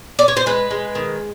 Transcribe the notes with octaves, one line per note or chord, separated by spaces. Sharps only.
D5
C#5
C5
G#3 B4
G#3
D#3